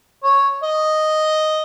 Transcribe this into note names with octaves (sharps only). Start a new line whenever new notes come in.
C#5
D#5